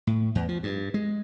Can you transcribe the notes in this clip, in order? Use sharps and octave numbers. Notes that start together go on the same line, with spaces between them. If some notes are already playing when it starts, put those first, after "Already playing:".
A2
E2
F3
G2
G#3